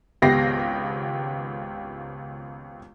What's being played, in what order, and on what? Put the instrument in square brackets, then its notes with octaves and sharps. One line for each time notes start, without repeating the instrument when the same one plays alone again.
[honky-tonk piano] G#1 C#2 B3 G4 A#6 C7